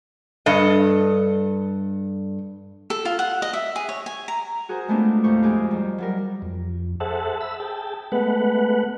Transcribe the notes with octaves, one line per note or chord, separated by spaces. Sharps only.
G2 A4 D#5
A4
F4
F#5
D#5
E5
G#4
C#5
G#5
A#5
F#4 G#4 A#4 C5
G#3 A3 B3 C4 D4 F4
D#2 A2 C5 F5 C#6
F2 G#3 G4 G#4
D#3 G3
F#3 G3 A#4
F2
G#4 A4 C5 E5 F#5 A5
E5 B5 E6
G#4 G5 A5
G#3 A3 B3 B4 F#5